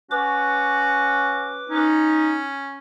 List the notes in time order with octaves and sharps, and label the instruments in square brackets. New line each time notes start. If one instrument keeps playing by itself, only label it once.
[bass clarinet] C#4 [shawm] F#4 [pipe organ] B4 D6
[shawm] C#4 [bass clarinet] D#4